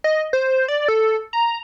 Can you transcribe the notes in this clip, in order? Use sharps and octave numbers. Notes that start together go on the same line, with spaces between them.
D#5
C5
D5
A4
A#5